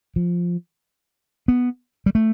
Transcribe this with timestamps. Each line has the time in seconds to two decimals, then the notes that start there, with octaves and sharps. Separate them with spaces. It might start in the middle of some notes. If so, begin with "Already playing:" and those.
0.16 F3
1.48 B3
2.06 G3
2.15 A3